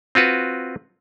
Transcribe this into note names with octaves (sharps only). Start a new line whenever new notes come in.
C4 F4 F#4 B4